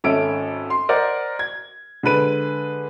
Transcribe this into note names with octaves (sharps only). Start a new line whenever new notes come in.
G#1 C#4 A4 E5 G#5 D7
C6
A#4 C5 D5 D#5 F#5
G#6
D3 G#3 B4 D#7